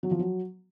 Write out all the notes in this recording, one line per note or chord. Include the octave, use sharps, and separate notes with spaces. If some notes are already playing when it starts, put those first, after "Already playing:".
F#3
F3
F#3